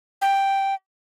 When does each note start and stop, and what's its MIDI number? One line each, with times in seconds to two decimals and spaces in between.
0.22 0.74 79